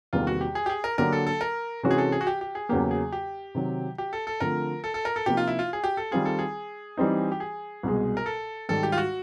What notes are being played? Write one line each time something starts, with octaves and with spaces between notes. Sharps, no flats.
E2 C3 D#3 G3 A#3 F4
F#4
G4
G#4
G4
G#4
A#4
D3 F#3 A#3 D4 G4 A#4
A4
A4
A#4
C3 E3 G#3 C#4 F#4
G#4
A4
G#4
F#4
G4
G4
G#4
E2 C#3 F#3 A#3 G4
G#4
G4
C3 D#3 F#3
G4
A4
A4
D3 F3 A3 C4 A#4
A4
A4
A#4
A4
C3 F3 A#3 D#4 G4
F4
E4
F4
G#4
G4
A4
D#3 G3 C4 F4 G#4
A4
G#4
E3 G3 C4 D#4
G4
G#4
C2 B2 G#3
A#4
A4
G#2 D#3 G3 A4
G4
F4
F#4